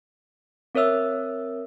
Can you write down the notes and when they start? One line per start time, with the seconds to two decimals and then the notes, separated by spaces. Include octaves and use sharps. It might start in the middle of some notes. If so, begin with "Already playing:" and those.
0.75 C4 A#4 C#5 E5 E6